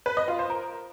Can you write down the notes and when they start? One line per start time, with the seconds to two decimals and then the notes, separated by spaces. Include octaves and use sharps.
0.06 B4
0.17 D#5
0.28 F4
0.39 C5
0.50 A#4